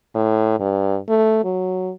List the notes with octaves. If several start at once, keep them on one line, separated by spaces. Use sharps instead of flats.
A2
G2
A3
F#3